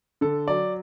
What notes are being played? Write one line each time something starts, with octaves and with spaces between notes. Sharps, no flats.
D3 A4
F#3 D5